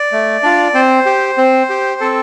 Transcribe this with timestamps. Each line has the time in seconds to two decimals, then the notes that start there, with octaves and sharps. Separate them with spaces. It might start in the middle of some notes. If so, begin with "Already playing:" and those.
Already playing: D5
0.12 A3
0.43 D4 F4
0.74 C4 C5
1.06 G4
1.38 C4
1.70 G4
2.01 C4 A4